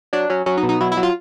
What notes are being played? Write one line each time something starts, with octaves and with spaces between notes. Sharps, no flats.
F#3 D4
F#3 C#4
F#3 C#4
D#4
B2
D#4
F#3 E4
E4
F#3
F4